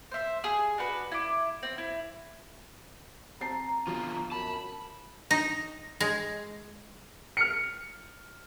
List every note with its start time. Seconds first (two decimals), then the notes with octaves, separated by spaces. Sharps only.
0.12 C5 E5
0.44 G#4
0.78 D4 F#4 B4
1.12 E4 D6
1.63 C4
1.78 E4
3.41 C4 A5 A#5 C7
3.87 B2 D3 F3 F4
4.32 F#2 A5 B5
5.31 D#4
6.00 G#3
7.37 F6 C#7